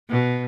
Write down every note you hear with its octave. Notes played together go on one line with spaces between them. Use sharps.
B2